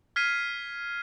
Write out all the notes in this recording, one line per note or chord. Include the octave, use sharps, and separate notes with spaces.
F6 G#6 B6 C7 D#7